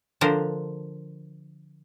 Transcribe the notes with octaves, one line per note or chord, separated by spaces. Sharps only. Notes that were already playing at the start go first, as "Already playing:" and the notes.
D3 F3 D4 A#4 C5